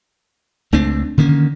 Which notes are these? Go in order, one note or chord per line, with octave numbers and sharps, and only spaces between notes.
C#2 A3 C4 D4
D3 D#3 A#3 C#4